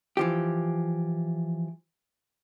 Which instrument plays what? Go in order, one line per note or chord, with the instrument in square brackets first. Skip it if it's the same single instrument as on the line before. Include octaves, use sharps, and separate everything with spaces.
[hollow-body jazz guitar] E3 F3 G4